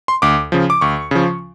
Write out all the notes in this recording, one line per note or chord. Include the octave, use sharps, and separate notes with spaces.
C6
D2 D6
C#3 F3
D6
D2 C#6
C#3 F3